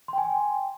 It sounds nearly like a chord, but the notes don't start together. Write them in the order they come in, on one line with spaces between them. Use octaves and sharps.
C6 G5 G#5